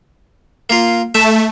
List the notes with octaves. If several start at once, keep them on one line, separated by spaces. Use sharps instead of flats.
A#3 F4
A3 E5 A5